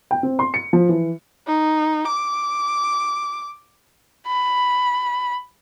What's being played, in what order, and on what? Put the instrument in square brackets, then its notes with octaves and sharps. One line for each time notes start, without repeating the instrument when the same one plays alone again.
[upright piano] G5
C4
C6
C#7
F3
E3
[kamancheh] D#4
D6
[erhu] B5